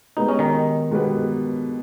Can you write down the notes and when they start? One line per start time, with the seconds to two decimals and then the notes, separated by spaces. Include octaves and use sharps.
0.17 B2 G#3 B3 D#4 G4 B4
0.29 C#4
0.39 D#3 D#4
0.91 B2 G#3 B3 G4 B4